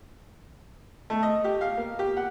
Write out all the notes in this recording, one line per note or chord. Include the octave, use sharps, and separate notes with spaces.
A3
D#5
G4
F5
A#3
G4
F#5